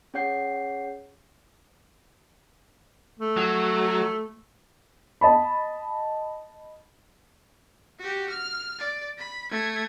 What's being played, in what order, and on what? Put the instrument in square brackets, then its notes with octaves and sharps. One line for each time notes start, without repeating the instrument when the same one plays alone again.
[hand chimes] C#4 G#4 C#5 F#5 G6 C7
[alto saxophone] A3
[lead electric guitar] F#3
[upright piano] D#5 A5 B5
[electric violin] F#4 G4
F6
D5
B5
A3 G#6